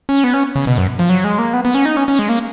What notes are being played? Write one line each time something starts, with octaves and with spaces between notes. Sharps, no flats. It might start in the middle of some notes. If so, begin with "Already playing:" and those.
C#4
B3
C#4
C#3
B2
F#2
F3
F#3
G#3
A#3
B3
B3
C#4
D#4
C#4
C#4
G#3
A#3